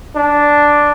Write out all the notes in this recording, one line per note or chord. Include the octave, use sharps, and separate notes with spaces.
D4